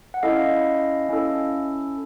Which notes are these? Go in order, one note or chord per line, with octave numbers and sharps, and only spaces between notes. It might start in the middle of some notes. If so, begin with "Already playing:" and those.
F#5
C#4 E4 A4 D#5 F5
C#4 E4 A4